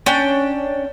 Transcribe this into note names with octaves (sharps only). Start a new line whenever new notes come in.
C#4 D4 G5